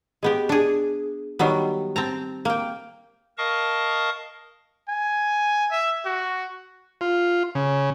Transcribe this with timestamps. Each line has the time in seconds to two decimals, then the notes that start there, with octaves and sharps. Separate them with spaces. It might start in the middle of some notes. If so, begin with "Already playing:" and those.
0.23 G#3 B3 G4
0.49 D4 G#4
1.39 D#3 F#3 G3 B3
1.96 C4 A5 A#5
2.45 A#3 G5
3.38 A#4 D#5 F5 A5 C#6 D#6
4.89 G#5
5.71 E5
6.05 F#4
7.01 F4
7.55 C#3